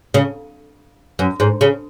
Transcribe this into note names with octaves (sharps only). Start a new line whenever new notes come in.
C#3
F#2
G#2
C#3